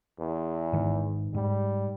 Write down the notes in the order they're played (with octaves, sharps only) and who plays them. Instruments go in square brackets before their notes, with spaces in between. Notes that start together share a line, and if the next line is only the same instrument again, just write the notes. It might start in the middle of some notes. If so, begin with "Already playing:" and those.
[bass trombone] E2
[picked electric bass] G#2 D#3
[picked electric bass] G#2 [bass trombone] G3